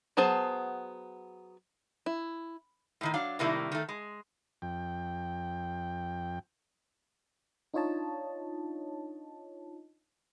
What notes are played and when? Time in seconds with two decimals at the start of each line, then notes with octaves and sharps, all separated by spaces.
0.17 F#3 B3 G#4 C5 A5
2.06 E4
3.01 A2 D#3 D#4
3.14 F#3 D4 F5
3.39 A2 C3 D#3 G3 A#3 E4
3.72 D#3 A3
3.89 G#3
4.62 F2 G5
7.74 D4 D#4 F4 C#5 D#5 A5